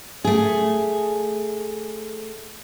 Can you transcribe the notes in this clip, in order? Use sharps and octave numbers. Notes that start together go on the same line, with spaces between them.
A3 G#4